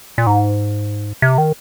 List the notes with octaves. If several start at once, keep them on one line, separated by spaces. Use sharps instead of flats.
A#2
G#2
C3
D#3